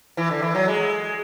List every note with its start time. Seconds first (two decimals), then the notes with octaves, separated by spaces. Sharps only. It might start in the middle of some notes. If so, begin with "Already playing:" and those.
0.17 E3
0.31 D3
0.42 E3
0.55 F#3
0.68 G#3